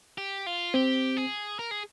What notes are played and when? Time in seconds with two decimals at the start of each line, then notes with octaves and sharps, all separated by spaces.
0.18 G4
0.46 F4
0.74 C4 G4
1.17 G#4
1.59 A#4
1.71 G#4